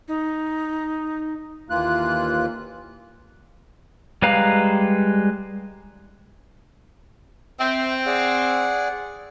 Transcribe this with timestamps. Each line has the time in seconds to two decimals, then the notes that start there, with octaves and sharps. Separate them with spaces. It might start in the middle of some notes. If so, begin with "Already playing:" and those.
0.07 D#4
1.70 D#2 E3 A#3 F4 F#6
4.22 G3 G#3 B4 F5 A#5
7.60 C4 E5 G5
8.06 G#4 D5 F#5